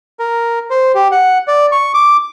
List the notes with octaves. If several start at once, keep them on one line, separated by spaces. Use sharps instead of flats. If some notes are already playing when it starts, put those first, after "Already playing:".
A#4
C5
G4
F#5
D5
C#6
D6